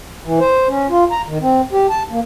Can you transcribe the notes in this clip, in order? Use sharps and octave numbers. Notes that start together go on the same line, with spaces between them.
E3
C5
C#4
F4
A#5
D#3
C4
G4
A5
A#3